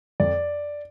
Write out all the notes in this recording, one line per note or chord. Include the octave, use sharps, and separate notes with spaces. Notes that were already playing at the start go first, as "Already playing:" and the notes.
F2 D5